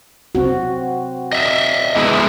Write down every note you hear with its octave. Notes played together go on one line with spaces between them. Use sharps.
C4 F#4
D#5 E5
G#3 B3 E4